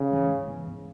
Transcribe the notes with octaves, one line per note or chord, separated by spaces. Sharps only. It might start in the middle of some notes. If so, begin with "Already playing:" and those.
Already playing: C#3
G#2 E3 G#3
G#2
E3 B3
G#2